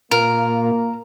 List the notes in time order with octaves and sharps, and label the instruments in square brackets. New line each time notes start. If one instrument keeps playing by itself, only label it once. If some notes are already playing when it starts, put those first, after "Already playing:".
[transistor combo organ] A#2 F4 [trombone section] A#3 [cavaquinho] A#4